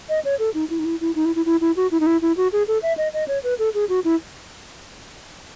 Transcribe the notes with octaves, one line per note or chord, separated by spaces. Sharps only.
D#5
C#5
A4
D#4
E4
D#4
E4
E4
D#4
E4
E4
E4
E4
F#4
E4
D#4
E4
E4
F#4
G#4
A4
E5
D#5
D#5
C#5
B4
A4
G#4
F#4
E4